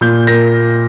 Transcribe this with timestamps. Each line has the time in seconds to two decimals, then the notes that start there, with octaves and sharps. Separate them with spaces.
0.01 A#2 G6
0.27 A#3 A#6